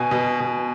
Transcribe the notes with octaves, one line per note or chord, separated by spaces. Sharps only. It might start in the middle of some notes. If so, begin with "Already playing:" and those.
Already playing: B2 G#5
B2
B2